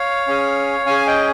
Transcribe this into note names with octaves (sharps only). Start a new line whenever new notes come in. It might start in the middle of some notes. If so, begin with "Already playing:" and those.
Already playing: C#5 F5
C#4 G#4
C#4 G#4 F5 G#5
D#5 G5